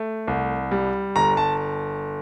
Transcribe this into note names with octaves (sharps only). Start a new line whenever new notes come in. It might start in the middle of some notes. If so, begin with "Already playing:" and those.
Already playing: A3
C2
G3
G1 A#5
A5